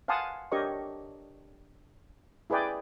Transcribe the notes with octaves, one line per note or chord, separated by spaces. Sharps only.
F5 F#5 G#5 A5 C6 D#6
D4 G4 A#4 C#5 D#5 C#6
E4 G#4 B4 D5 G5